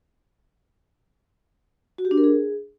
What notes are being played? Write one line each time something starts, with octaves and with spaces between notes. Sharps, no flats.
F#4
G4
D4
A#4
G#4